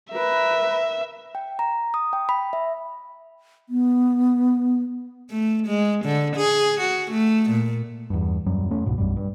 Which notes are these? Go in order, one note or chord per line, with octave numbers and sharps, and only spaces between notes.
A#4 B4 E5
G5
A#5
D#6
G5
B5
E5
B3
A3
G#3
D3
G#4
F#4
A3
A#2
E2 G2
D#1 F#2 F#3 G3
E1 A3 C#4
C#2 G#2 B2
B1 F#2 G3
G2